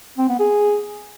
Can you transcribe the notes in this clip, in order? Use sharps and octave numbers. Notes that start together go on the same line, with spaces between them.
C4
B3
G#4